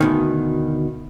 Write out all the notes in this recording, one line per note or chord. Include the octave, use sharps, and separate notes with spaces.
D2 B2 D#3